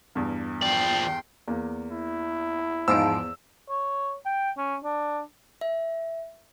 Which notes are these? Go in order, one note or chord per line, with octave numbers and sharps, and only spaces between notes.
E2 G2
F3 D5 G5 C6
E2 A#3
E4
E2 G#2 F3 E6 D7
C#5
G5
C#4
D4
E5